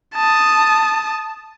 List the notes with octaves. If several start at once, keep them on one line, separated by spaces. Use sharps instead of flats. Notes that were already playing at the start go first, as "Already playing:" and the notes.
A5 D#6